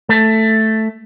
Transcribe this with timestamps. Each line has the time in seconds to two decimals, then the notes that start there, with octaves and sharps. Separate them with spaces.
0.09 A3